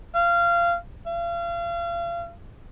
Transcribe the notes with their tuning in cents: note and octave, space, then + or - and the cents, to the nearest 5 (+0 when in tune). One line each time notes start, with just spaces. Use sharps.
F5 -20
F5 -35